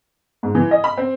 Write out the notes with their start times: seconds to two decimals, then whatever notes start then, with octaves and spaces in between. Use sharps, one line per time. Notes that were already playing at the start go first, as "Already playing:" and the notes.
0.43 G#2
0.55 E3
0.71 D#5
0.84 B5
0.97 C4